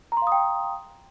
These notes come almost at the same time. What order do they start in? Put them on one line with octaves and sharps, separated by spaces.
A#5 C6 F5 D#6 G5